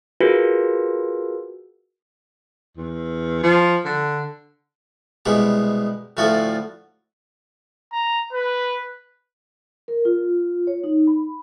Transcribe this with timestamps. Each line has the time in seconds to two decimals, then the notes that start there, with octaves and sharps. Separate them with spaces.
0.20 F4 F#4 G#4 A#4 B4
2.77 E2
3.43 F3
3.85 D3
5.25 C2 B2 G#3 G4 F#5
6.17 D2 A2 F3 F#4 A4 F#5
7.93 A#5
8.33 B4
9.88 A#4
10.05 F4
10.67 C#5
10.84 D#4
11.07 B5